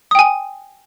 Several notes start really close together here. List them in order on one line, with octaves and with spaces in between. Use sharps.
D#6 G5 G#5